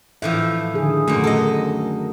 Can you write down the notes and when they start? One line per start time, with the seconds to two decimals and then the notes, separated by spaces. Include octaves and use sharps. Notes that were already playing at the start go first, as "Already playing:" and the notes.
0.22 A2 E3 F3 E5
0.74 D3 D#3 G#4
1.08 F#2 A#2 A3
1.24 A4 D#5